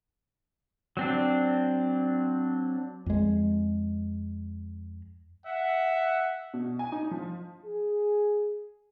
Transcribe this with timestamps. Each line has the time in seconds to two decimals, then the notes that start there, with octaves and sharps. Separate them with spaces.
0.97 F#3 C4 D4
3.06 F2 G#3
5.46 E5 F#5
6.54 B2
6.79 G#5
6.92 D#4
7.11 F3
7.65 G#4